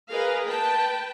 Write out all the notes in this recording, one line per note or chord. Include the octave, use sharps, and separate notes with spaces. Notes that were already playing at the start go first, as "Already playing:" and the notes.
G#4 A#4 B4 D#5 F5
B4 G5 A5